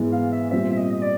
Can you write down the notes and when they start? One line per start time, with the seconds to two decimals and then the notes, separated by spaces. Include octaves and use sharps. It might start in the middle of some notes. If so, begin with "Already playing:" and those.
Already playing: G#2 E3 G#3 B3
0.12 F5
0.32 E5
0.51 A#2 G3 C4 E5
0.73 E5
0.77 D#5
0.92 D#5
1.02 D5